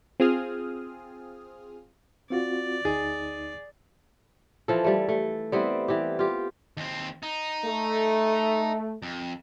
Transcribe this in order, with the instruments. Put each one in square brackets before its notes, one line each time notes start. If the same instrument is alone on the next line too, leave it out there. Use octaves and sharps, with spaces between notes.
[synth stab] C4 F4 G#4 D#6 F6
[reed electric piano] C4 F4 F#4 [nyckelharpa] D5
[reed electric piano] D2 D#4 A6 [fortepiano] G#4
[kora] E3 F3 A4
G3 A3
A3
G3 B3 C4 E4
E3 G4
F4 G4
[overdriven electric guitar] D#2 C4
D#4
[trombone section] A3
[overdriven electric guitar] F2